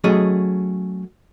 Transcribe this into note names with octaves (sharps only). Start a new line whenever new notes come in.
F#3 A3 C#4 G#4 D#5